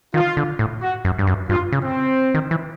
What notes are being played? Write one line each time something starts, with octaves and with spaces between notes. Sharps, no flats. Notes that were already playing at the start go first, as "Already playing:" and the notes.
D#3 F4
D3
A2
F#4
F#2
G2
F#2
G2 F4
C#3
C4
D#3
E3